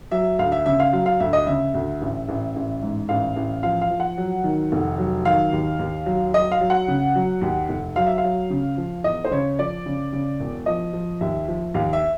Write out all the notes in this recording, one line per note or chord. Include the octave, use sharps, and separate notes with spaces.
F#3 E5
D2 F5
E5
C#3 E5
F5
F#3 F5
F5
D2 E5
D#5
C#3 E5
D2
A1
A1
A1
G#2
A1 F5
A1
F3 F5
F5
F3
F#5
F#3
D#3
F1
F#3
D#3 F5
D#2
D#2
F#3
F#3 D#5
F5
F#3
F#5
C#3
F#3
D#2
F1
F#3 F5
E5
F5
F#3
C#3
F3
E2 D#5
C5
C#3 C#5
F3 D5
C#3
C#3
E1
F3 D#5
F3
D#2 E5
F3
D#2 F5
E5